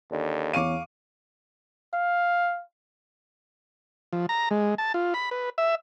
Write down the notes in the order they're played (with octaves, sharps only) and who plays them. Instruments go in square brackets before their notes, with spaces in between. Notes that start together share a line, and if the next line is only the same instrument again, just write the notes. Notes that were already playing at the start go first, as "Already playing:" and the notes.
[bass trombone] D#2 [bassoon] D3
[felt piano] E2 D#7 [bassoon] C#4 [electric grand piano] F5 C#6 D6
[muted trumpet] F5
[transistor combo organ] F3
A#5
G#3
A5
F4
B5
B4
E5